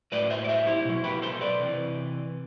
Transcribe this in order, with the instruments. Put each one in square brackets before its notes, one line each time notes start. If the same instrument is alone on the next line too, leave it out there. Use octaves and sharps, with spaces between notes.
[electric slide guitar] A2 F#3 B4 D5
C5 E5
D5
C5 E5
E4 G4
B2 F#3
G4 B4
A4 C5
B4 D5
C3 E3